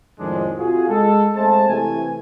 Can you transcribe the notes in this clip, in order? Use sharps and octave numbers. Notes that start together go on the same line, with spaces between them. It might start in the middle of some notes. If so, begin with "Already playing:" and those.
F2 A2 D#3 F3 G#3 D4
C3 F4 F#4 G#4
G#3 A4
G#3 A3 C4 C5 A5
C3 E3 A3 G#5